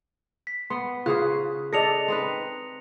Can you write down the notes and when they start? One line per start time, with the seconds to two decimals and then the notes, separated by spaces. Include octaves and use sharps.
0.47 B6
0.70 B3 C6
1.06 C#3 F4 G#4 C5 F#6
1.73 G#4 A4 D5 D#5 A#6 C#7 F7
2.08 C4 D#4 B4